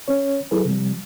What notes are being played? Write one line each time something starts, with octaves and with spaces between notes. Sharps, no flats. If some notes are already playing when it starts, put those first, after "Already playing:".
C#4 C#5
F#3 E4 G#4 A4 B4
C3 F3 G3